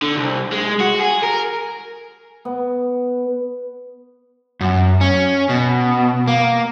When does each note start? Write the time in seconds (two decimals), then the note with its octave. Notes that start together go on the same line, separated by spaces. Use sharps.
0.02 D3
0.17 C2
0.52 G#3
0.80 F#4
1.00 G#4
1.23 A#4
2.45 B3
4.61 F#2
5.01 C#4
5.49 B2
6.28 A#3